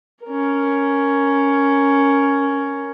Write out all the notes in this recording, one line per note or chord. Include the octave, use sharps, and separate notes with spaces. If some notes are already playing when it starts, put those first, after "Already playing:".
C#4 A#4